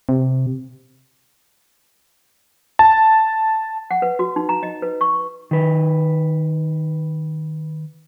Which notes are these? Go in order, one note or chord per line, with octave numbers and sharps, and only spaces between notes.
C3
A5
F#5
B4
F#4
D#4
A#5
D#5
B4
C#6
D#3 B4